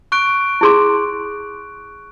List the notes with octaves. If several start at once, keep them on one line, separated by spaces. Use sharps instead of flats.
C#6 F#6 D7
E4 G#4 C6